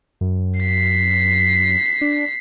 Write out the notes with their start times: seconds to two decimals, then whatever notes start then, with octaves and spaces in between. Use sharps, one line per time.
0.21 F#2
0.60 B6 C7
2.01 D4